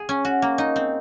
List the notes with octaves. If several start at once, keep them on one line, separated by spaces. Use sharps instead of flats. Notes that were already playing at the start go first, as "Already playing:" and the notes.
Already playing: G#4
C#4
F#4
A#3
D#4
C4